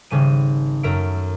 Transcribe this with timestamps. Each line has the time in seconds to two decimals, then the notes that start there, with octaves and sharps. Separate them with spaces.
0.11 G#1 C#3 G3 D#7
0.83 F#2 A3 A#4 E5 D7